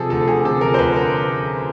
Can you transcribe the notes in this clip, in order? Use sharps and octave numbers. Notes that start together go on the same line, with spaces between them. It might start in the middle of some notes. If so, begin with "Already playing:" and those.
Already playing: C3 F3 G#4 A4
D2 A4
D2 G#4
C3 A4
F3 A#4
C5
D2 B4
A#4